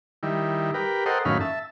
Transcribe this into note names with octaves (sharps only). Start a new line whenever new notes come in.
D#3 G3 E4
G4 A#4 B4
A4 A#4 C5 D#5 F#5 G5
F#2 A2 D#3 C#4 F5 B5
E5 A5